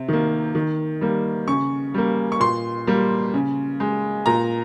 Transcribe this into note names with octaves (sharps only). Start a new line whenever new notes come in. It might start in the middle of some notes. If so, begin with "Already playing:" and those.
Already playing: C3
D#3 A#3
D#3
G3 A#3
C#3 C#6
G3 A#3
C#6
A#2 C6
G3 A#3
C#3
G#3
A#2 A#5